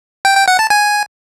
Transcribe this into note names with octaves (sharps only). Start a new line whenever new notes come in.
G5
G5
F#5
A5
G#5